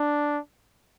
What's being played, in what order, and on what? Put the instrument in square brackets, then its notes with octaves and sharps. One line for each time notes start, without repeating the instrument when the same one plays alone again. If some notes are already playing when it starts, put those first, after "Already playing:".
Already playing: [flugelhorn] D4